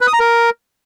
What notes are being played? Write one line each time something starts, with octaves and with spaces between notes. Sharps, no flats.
B4
D#6
A#5
A#4